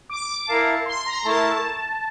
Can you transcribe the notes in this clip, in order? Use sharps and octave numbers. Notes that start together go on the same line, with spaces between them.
D6
E4 A#4 F5 A5
C6
A#5
A3 E4 A#4 A5